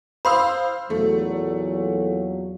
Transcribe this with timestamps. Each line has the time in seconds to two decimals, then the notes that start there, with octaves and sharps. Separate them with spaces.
0.25 C5 F5 B5 C6 D#6 E6
0.90 E2 A#2 F#3 A3